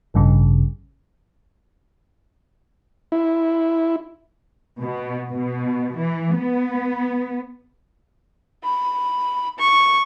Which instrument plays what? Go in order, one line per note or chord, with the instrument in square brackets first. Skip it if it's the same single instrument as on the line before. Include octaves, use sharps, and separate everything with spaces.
[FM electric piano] A1 G2 C#3
[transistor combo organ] E4
[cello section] B2
B2
E3
B3
[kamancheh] B5
C#6